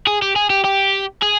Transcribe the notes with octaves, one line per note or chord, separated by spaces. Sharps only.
G#4
G4
G#4
G4
G4
G#4